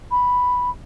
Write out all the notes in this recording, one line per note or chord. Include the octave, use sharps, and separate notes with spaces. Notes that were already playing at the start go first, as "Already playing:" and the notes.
B5